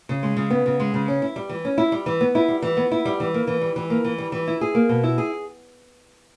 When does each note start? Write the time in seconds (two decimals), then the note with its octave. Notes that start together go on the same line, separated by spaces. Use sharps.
0.09 C#3
0.23 G#3
0.36 C#3
0.50 B3
0.66 C#3
0.80 G#3
0.94 C#3
1.08 C#4
1.22 E4
1.36 G3
1.49 E3
1.65 C#4
1.78 E4
1.92 G3
2.06 E3
2.21 B3
2.35 E4
2.48 G3
2.62 E3
2.77 B3
2.91 E4
3.05 G3
3.20 E3
3.34 A#3
3.47 E3
3.61 G3
3.76 E3
3.90 A#3
4.04 E3
4.18 G3
4.32 E3
4.47 E4
4.61 G#4
4.75 A#3
4.89 B2
5.03 E4
5.18 G#4